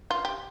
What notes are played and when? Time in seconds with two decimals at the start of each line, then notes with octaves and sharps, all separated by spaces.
0.11 F4
0.25 G4